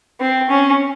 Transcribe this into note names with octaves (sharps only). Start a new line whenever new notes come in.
C4
C#4